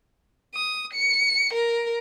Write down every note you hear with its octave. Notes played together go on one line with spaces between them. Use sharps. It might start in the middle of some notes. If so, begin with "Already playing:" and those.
D#6
C#7
A#4